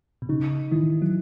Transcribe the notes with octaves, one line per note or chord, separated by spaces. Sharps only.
B2
C#3 D#4
D#3 E3
F#3